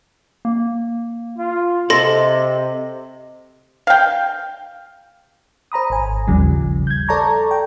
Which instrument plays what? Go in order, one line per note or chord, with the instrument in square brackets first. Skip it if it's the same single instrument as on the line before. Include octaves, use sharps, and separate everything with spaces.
[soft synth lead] A#3
[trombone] F4
[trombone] C3 [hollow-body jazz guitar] A4 [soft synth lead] D#5 [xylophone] C6 A#6
[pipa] F5 G5
[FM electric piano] C5 A#5 B5 D#6
G#1 G#5
A1 D#2 C#3 F3 G3
G6 G#6
A4 D5 A5 A#5 C#6
G5